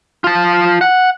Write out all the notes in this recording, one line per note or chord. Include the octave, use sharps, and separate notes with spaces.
F4 A5
F#5